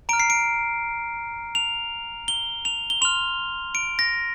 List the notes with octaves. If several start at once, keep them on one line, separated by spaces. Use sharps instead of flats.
A#5 F6 D7
C7
D7
F7
G7
F7
G7
C6 F6 F7
D7
A#6